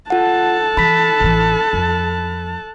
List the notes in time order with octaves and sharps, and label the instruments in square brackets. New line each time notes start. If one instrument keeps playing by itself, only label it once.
[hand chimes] F4 F#5 [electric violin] A4 F#6 [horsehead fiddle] A5
[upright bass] E3 [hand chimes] B5 B6
[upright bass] A1 E3
F2